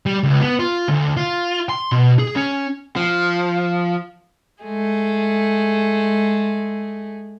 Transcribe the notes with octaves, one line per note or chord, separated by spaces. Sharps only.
G3
C#2
B3
F4
D2
F4
C6
B2
G#4
C#4
F3
G#3 A3 G#4